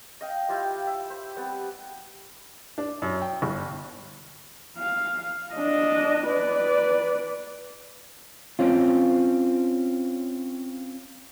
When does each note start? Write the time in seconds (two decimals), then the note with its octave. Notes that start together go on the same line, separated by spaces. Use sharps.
0.21 D#5 F5 G5
0.49 E4 F4 G4 C5
0.87 E5
1.10 C5
1.37 G3 B3 C4
2.78 D4
3.02 F#2
3.22 G5
3.42 G1
4.78 F5
5.54 D4 D#5
6.27 B4 D5
8.59 C4 C#4 F4